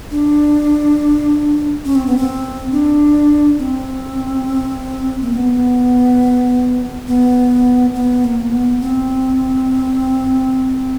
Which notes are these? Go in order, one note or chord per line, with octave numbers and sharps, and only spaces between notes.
D4
C#4
C4
B3
C4
D4
C4
A#3
C4
B3
B3
B3
A#3
B3
C4